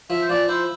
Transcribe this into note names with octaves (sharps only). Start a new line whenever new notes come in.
F3 E5
C5
F3 D5
E4 C5